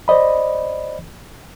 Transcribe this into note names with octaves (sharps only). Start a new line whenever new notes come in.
C5 D5 D#5 B5